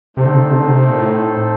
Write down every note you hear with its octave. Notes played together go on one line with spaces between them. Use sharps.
C3 A3 C4 D#4 A4 C5
D3
C3
D3
C3
D3
C3
A#2
A2